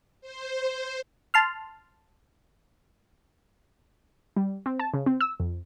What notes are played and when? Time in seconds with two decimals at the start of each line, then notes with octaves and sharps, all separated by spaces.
0.21 C5
1.34 A5 C6 F6
4.37 G3
4.66 C4
4.79 A5
4.94 C#3
5.06 C4
5.21 E6
5.40 F2